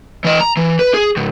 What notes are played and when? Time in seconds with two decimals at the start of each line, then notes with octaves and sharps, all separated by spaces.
0.24 E3 D#5
0.41 A#5
0.57 E3
0.79 B4
0.94 G#4
1.17 C#2 G#2